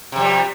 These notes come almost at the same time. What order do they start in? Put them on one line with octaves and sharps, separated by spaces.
C3 F2 G3